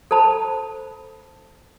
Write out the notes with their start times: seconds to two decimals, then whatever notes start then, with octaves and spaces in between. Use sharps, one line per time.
0.11 A4 C5 A5 B5